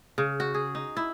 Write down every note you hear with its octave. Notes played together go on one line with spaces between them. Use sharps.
C#3
F#4
G#4
D#4
E4